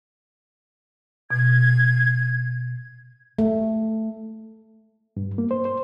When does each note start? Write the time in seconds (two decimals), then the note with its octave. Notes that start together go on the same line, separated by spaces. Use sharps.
1.31 B2 G#6
3.39 A3
5.17 G2
5.38 A#3
5.51 C5
5.65 C5